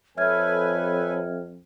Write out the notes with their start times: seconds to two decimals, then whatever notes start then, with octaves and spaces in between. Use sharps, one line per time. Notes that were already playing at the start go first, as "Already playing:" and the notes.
0.17 F2 A4 B4 C#5 E5 G#5 F6 G#6